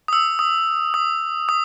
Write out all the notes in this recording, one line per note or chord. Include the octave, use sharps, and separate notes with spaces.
D#6
E6
D#6
D#6
D#6